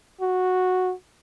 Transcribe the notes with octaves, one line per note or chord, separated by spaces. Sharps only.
F#4